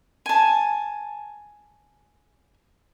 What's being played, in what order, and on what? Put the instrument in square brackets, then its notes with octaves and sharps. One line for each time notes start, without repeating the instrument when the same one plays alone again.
[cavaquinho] G#5 A5